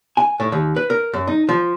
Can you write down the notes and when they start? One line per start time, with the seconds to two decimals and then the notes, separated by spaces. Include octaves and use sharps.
0.17 G#5
0.40 A2
0.52 D#2
0.76 B4
0.90 A#4
1.13 F#2
1.27 D#4
1.49 F3